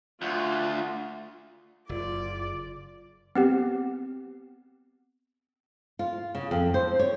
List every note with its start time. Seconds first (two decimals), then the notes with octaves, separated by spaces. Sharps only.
0.22 D2 F4
1.89 F#1 F4 D5
3.35 B3 C4 G4
5.99 F4
6.35 C#3
6.51 F2
6.74 C5
6.99 C#5